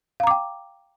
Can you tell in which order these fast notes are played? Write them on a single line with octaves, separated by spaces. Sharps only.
F5 A#5 D6 G5